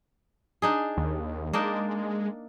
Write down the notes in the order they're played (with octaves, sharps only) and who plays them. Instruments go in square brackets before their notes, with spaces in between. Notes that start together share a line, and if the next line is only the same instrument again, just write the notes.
[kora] D4 D#4 G#4
[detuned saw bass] D#2
[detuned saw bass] G#3 [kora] A#3 D4 D#4